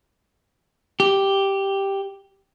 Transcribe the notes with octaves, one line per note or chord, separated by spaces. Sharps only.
G4